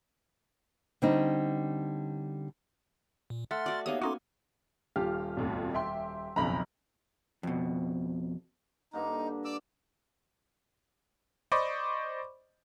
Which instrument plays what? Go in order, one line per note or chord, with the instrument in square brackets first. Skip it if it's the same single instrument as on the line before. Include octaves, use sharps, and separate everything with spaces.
[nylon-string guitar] D3 G3 C4 C#4 D#4
[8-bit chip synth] A#2
[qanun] A3 [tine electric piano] E5 F#5 [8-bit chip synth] C6 F6 A6
[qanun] F#4 D5
[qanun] A#3 B3 D#4 [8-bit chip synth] G4 C#5 F5 [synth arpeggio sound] D#6
[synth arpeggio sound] C#4 D#4 F#4 [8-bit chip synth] A4 C6 D6 [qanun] G#5
[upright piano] D#1 F4 G4 [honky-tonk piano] F6
[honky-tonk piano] B1 F2 A2
E5 G5 C6
[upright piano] F#1 B1 F2 [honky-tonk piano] A#5 B5
[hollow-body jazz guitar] F2 B2
[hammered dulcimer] G2 D3 A#3 [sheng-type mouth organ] D#4
[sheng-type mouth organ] D5 D6 E6
[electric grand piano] C5 D5 D#5 B5 C#6 D6